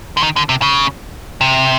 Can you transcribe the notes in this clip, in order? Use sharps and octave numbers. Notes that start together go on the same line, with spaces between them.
D3
D#3
D3
C3
C#3
C3